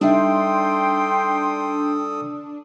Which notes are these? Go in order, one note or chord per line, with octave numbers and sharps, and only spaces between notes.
G3 D4 D#4 A4 E5 G5 C6 D#6